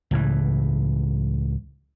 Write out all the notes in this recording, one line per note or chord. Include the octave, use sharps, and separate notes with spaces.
C#2 A2 E3